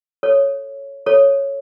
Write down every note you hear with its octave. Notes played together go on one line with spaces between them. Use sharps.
A4 C#5
A4 C#5